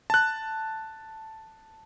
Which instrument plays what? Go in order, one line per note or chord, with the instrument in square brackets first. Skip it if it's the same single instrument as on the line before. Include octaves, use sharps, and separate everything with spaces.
[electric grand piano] A5 F#6